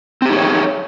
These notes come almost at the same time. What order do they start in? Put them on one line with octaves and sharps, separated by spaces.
C4 G4 D#4 G#4 C#5